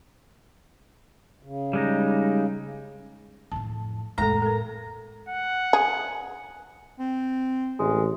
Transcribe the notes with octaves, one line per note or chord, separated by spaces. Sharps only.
C#3
G3 G#3 D#4
F2 A2 A5
F2 A2 G#3 A3 A4 A#5
A4 A#4
F#5
G#4
C4
A1 G#3